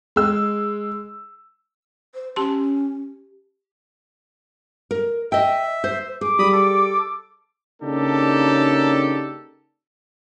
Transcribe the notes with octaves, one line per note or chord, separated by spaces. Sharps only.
G#3 E6
C5
C#4 G4 A5 C6
A#4
D#5 E5 G5
C5
G#4 D6
G3 B5 D#6
A4
C#3 A#3 D4 D#4 G4 A4